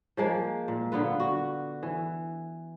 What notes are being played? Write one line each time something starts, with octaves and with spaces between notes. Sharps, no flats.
F3 G#3 A#3
A#2
D3 B3 F4 B4
F#4
E3